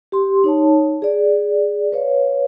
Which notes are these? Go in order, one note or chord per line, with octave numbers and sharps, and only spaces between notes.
G4 C6
D#4 C#5 A5
G#4 D5
B4 C#5 F5